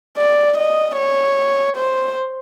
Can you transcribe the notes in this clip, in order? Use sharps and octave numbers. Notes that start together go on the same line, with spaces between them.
D5
D#5
C#5
C5